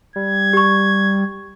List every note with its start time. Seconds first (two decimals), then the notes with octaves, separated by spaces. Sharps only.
0.16 G3 G#6
0.53 G4 C#6